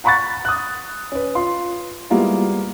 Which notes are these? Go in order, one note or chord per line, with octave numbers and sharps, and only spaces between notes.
F#5 A#5 B5 C#6 F#6 A6
D#6 F#6
C#4 B4
F4 C6
G3 G#3 A#3 B3 E4 F4